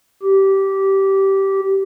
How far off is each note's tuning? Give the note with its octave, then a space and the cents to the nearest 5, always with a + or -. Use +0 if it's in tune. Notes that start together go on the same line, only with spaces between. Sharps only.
G4 -15